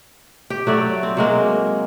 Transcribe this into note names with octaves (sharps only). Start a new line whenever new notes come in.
G4
F#3 A3 D5
C4
F#3 G#3 A#3